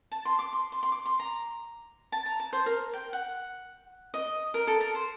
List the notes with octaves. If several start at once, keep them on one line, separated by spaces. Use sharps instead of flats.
A5
C6
D6
C6
C6
C6
D6
C6
A#5
A5
A#5
A5
C5
A#4
G5
F#5
D#5
A#4
A4
A#4
C5